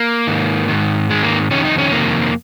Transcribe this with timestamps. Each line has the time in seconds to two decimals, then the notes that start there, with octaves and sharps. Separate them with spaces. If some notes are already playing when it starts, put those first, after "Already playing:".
Already playing: A#3
0.27 G#2 D#3
0.68 G#2 D#3
1.10 G#2 D#3 G#3
1.23 A#3
1.51 F2 C3 D#3 C#4
1.65 D#4
1.78 C#4
1.91 F2 C3 D#3 A#3